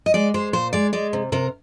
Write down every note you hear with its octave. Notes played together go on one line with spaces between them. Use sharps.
D#5
G#3 D5
G#3 C5
A#2 C5
G#3 D5
G#3 D5
C3
C3 A#4